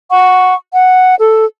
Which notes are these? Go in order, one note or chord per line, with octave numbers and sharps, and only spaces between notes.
F#5 C#6
F#5
A4